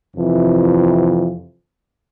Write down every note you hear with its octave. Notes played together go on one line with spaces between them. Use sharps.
F2 C3 E3